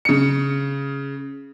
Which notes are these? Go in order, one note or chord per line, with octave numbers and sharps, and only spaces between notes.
C#3 C#7